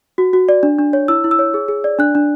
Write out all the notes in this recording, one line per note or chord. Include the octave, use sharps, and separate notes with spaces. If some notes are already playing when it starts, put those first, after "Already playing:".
F#4
F#4
D5
D4
D4
C#5
E4 E6
E4
E6
C#5
G#4
G#4
D5
D4 F#6
D4